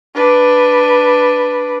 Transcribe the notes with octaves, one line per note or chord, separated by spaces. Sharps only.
D4 B4